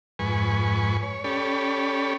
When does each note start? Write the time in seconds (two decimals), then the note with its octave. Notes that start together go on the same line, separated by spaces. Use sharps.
0.19 F2 G#2 B4 G#5 C#6
1.03 C#5
1.24 C#4 G4 A4 C#5 D5 B5